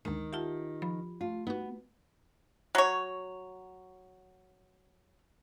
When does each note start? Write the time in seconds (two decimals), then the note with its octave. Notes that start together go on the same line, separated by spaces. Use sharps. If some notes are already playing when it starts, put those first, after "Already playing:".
0.05 D2 D#3 G#3
0.33 F4 G4 E5 F#5 A5
0.82 F3 B5
1.21 A3 F4
1.47 B3 D#4 F#4
2.75 F#3 C#5